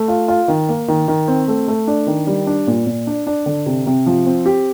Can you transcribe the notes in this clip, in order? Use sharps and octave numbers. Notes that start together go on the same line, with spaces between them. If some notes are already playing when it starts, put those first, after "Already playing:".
Already playing: A3
F4
F4
D#3
A#3
D#3
D#3
C4
A3
A3
D4
D#3
G3
D4
A#2
A#2
D4
D4
D3
C3
C3
F3
C4
G4